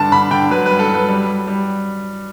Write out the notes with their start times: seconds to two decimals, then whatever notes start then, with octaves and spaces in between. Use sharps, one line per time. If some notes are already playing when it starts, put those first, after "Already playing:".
Already playing: G2 D3 A5
0.12 D3 B5
0.31 D3 G5
0.50 F#3 B4
0.66 G2 B4
0.79 A4
0.89 F#3
0.94 B4
1.09 G3
1.29 G3
1.47 G3